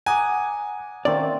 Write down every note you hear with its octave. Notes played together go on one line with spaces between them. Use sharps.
F#5 G#5 A#5 D6 D#6
D#3 A3 A#3 C4 C#4 D5